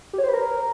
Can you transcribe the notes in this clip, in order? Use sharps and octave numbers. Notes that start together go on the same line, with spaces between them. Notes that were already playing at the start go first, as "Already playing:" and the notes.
G4
C#5
C5
B4
A#4